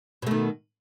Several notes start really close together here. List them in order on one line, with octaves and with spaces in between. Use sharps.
B2 A3 D#3